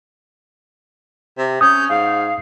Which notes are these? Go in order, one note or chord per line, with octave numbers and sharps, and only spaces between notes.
C3
C#4 D#6 G6
G#2 F5